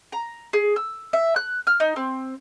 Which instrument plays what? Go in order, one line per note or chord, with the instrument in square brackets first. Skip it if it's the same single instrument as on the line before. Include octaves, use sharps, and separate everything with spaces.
[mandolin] A#5
G#4
E6
E5
F#6
F6
D#4
C4